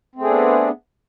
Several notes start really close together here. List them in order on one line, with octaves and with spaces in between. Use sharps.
C4 A3 G#4 D4 B3